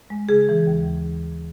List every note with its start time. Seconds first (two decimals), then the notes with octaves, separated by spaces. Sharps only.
0.10 G#3
0.29 C#3 G#4
0.49 E3
0.67 D#2